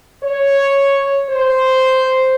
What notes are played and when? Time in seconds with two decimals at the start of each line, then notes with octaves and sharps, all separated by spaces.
0.23 C#5
1.29 C5